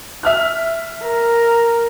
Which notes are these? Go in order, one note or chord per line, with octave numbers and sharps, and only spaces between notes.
E5 F6 F#6
A#4